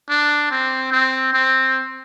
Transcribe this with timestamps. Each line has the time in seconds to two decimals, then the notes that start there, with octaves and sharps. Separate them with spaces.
0.10 D4
0.51 C4
0.92 C4
1.33 C4